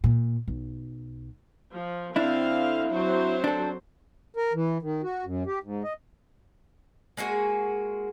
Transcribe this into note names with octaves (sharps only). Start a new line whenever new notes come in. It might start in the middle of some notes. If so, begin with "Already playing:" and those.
A#2
B1
F3
D3 C4 D4 E4 F5
F#3 C4 C5
D4 A4
A#4
E3
D#3
F#4
F#2
G4
G#2
D#5
G#3 A#3 F#4 G#4